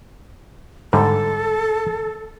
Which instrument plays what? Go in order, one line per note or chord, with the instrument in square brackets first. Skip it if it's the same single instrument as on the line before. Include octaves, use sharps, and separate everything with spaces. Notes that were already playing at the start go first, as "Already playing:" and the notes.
[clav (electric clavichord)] G#2 D3 G3 [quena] A4